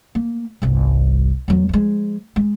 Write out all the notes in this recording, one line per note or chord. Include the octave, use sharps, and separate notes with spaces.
A#3
G1 C2
E2 F#3
F3 G#3
G#3